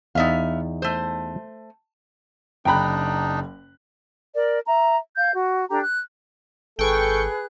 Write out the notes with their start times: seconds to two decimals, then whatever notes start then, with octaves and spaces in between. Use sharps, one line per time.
0.15 E2 B3 D#4 E5 F5
0.82 A3 C5
2.65 F#1 D4 D#4 G5 A#5 B5 F#6
4.34 A#4 D5
4.66 E5 A#5
5.17 F5 G6
5.33 F#4
5.69 D4 G4 A4 A#5
5.82 F#6
6.79 G#1 G#4 A4 B4 G5 C#6 F#6